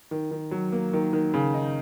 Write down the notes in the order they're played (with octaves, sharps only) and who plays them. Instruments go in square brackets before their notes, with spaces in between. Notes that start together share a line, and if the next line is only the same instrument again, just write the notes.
[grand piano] D#3
D#3
F#3
A#3
D#3
D#3
C#3
D#4